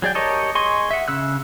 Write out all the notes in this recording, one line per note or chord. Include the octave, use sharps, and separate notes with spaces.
F#3 G#4 D5 G5
G4 A#4 C#5 D#5 A5
G#4 D#5 G#5 C6 C#6
E5 F#5
C#3 E6 F#6